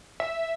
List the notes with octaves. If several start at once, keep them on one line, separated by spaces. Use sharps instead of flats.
E5